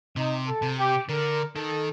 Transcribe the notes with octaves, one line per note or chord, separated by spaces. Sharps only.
C3 D#4
A4
C3
G4
D3 A#4
D#3 A4